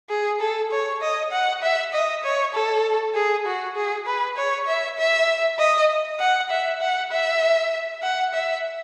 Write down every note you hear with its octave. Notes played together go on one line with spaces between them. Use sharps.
G#4
A4
C#5
D#5
F#5
E5
D#5
C#5
A4
G#4
F#4
G#4
B4
C#5
E5
E5
D#5
F#5
E5
F#5
E5
F#5
E5